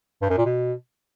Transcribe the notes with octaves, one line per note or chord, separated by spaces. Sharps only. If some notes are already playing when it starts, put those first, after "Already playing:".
G2
F#2
A#2
B2